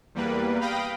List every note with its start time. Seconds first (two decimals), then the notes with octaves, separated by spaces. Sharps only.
0.15 E2 G3 A#3 B4
0.60 F5 G5 B5 D#6 A#6